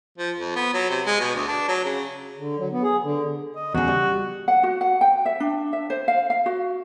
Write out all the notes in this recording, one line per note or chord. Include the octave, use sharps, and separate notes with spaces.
F3
F2
B3
F#3
C3
G#3
B2
D2
D4
F#3
C#3
D3
F#3
B3
G#4
D3
D#5
E2 C#3 F#4
G3
F#5
F#4
F#5
G5
E5
D4
E5
C5
F5
F5
F#4